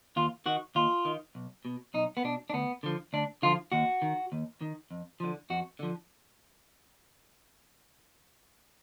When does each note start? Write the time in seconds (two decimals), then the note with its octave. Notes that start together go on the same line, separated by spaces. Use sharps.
0.16 D#2 F4
0.46 D#3 F#4
0.75 D#2 F4
1.05 D#3
1.35 B1
1.65 B2
1.94 B1 D#4
2.17 B3
2.24 B2 D4
2.50 D4
2.53 D2 B3
2.83 D3 F3
3.13 D2 D4
3.42 D3 F3 F4
3.72 D#2 F#4
4.02 D#3
4.32 D#2
4.61 D#3
4.91 F2
5.20 D3 F3
5.50 F2 F#4
5.79 D3 F3